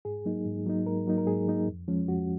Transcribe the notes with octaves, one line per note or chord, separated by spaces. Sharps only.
G#2 G#4
F#3 A#3 D#4
G#2
F#3 A#3 D#4
G#2 A#4
F#3 A#3 D#4
A#4
G#2 G#4
F#3 A#3 D#4
F2
F3 G#3 C#4
F2 F#4